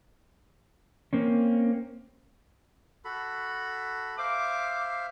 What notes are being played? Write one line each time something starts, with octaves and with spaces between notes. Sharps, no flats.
A#3 C4 C#4
F#4 A4 B5
C5 E5 F5 D6